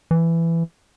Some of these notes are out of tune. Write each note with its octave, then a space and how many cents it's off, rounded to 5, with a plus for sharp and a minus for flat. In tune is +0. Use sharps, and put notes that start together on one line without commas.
E3 +15